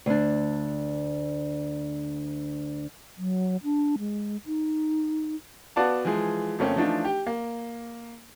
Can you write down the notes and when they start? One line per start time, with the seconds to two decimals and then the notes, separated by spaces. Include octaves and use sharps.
0.06 D2 D4
3.18 F#3
3.64 D4
3.99 G#3
4.46 D#4
5.76 B3 F#4 B4 D5 F5 A5
6.05 E3 F3 G#3 G#4
6.59 F2 C#3 A3 A#3 C4 C#4
6.76 E3 F3 A3 D4 D#4 F4
7.05 G4 G5
7.27 A#3